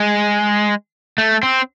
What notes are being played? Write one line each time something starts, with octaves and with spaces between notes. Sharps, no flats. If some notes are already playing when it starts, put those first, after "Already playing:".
Already playing: G#3
A3
C4